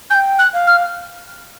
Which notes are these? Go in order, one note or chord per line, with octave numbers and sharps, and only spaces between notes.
G#5 G6
G5
F#6
F5
F6